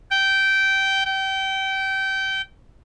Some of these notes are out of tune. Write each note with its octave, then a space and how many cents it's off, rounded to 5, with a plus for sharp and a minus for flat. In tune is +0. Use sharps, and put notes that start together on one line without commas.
G5 -15
G5 -25